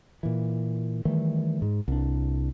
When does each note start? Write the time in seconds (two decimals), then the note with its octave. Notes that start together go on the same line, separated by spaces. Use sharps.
0.23 A#2 E3
1.05 D#3 E3 G3 A3
1.62 G#2
1.88 C2 D4